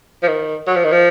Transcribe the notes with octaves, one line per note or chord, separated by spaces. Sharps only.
F3
D#3
F#3
F3
D#3
F3